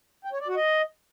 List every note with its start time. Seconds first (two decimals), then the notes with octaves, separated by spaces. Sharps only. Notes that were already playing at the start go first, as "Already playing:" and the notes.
0.25 G5
0.32 C#5
0.40 D5
0.48 F#4
0.55 D#5